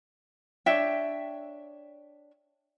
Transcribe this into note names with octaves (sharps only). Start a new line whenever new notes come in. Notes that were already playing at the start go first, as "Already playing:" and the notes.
D4 C#5 E5 G5